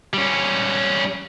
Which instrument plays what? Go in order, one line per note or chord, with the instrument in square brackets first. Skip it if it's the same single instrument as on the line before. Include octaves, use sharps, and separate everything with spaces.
[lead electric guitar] G3 C#4